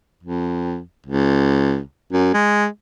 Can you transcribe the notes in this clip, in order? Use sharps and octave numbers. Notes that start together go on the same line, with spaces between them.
F2
C#2
F#2
G#3